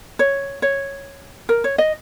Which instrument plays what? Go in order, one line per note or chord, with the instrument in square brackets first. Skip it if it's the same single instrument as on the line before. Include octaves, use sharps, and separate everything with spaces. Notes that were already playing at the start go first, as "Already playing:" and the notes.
[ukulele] C#5
C#5
A#4
C#5
D#5